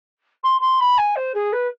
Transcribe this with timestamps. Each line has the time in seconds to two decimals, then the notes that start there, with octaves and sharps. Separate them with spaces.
0.43 C6
0.60 C6
0.80 B5
0.97 G#5
1.15 C5
1.34 G#4
1.52 B4